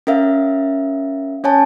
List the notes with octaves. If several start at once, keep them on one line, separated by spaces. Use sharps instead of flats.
C#4 A#4 E5 F5
C#4 C#5 G#5 A5